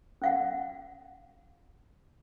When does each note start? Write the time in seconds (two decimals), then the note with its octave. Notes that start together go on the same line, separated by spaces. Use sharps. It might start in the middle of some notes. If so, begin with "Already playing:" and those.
0.22 C#4 F5 F#5